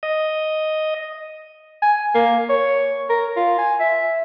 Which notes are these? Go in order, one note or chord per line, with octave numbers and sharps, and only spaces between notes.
D#5
G#5
A#3
C#5
A#4
F4
G#5
E5